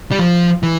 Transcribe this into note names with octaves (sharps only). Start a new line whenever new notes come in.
G3
F3
E3